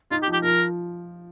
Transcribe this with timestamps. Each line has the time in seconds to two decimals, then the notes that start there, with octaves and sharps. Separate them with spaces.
0.11 D#4 F4
0.23 G4
0.28 F3
0.33 G4
0.44 F3 A#4